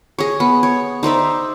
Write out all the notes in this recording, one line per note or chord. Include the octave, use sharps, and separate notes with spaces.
G#4 C#5
B3
C#5
D#4 C5 D5 E5